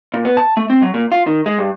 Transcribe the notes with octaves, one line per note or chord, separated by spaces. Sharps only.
A#2
B3
A5
A3
C4
F#3
A#2
F4
D#3
G#3
G2